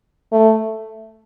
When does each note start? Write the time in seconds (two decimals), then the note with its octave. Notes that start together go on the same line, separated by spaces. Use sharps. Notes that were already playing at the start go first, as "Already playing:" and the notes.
0.32 A3